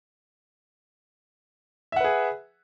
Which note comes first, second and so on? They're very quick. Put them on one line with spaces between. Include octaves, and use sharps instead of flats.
E5 F#5 B4 G#4